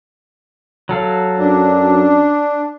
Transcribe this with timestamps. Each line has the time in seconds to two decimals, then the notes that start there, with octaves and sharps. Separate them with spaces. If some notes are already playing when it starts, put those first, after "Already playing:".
0.89 F#3 A4 F5
1.39 F#2 D4